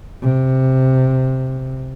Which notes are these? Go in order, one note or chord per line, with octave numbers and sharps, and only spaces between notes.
C3